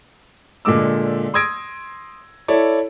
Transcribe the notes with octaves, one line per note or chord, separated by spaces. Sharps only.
A#2 D3 G#3 D6 E6
C6 D#6 E6 G#6 A#6 D7
E4 A4 C#5 D5